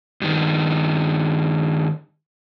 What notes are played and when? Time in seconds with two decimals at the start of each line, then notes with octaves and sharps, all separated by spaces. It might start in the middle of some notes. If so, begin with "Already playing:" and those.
0.22 G2 D#3